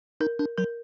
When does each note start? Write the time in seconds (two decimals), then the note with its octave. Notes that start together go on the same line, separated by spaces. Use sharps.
0.20 D#4 A#4
0.39 D4 A#4
0.58 F#3 A#4